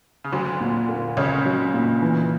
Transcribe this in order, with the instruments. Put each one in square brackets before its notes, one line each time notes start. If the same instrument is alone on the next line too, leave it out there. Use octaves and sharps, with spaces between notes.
[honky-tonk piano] C#3
[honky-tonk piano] D2 D3 [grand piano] F#3
[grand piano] A#2
A#3
[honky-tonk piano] C#2 C#3 [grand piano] C#4
[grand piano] F#3
A#2
E3